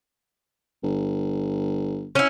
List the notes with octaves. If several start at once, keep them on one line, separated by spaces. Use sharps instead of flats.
G1
C#4 E4